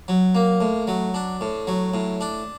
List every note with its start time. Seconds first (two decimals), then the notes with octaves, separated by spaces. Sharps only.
0.08 F#3
0.35 A#3
0.61 A2
0.87 F#3
1.14 D4
1.41 A2
1.67 F#3
1.94 A2
2.21 D4